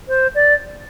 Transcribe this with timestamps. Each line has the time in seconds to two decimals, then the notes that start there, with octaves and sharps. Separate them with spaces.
0.08 C5
0.35 D5